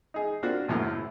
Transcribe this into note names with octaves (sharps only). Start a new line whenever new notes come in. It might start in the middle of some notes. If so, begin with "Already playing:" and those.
D#4 G#4
A#3 C4 D4 F4 F#4
C#2 F#2 A2 A#3
E4